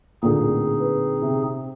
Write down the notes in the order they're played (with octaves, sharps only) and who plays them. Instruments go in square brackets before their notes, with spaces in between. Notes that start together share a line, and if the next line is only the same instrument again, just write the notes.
[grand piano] D1 [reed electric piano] A#2 D3 [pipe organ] C4 D#4 G#4
[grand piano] B4
C3